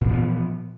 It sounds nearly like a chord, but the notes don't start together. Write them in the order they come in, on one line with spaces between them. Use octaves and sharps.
A#2 E3 F3 B3